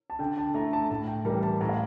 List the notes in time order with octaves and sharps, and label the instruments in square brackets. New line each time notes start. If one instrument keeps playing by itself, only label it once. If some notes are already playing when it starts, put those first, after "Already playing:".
[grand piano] A5
[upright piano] D3 [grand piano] G5
[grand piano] A5
[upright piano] A3 E4 [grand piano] A#5
[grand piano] A5
[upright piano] A2 [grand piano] A5
[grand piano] G5
[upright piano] E3 G3 [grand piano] A#4
[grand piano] A5
[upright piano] A2 [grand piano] A#5
[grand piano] F5